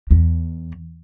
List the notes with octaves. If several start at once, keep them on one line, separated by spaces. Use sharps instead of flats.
E2